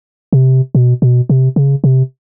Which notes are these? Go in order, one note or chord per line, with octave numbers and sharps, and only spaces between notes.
C3
B2
B2
C3
C#3
C3